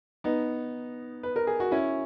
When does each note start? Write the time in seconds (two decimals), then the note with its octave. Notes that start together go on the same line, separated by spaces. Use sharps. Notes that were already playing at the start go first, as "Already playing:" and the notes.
0.24 B3 D#4
1.23 B4
1.36 A#4
1.47 G#4
1.60 F#4
1.71 C#4 E4